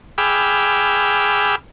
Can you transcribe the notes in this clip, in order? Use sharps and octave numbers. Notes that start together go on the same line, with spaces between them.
G#4 G5 B5 D6 E6 F6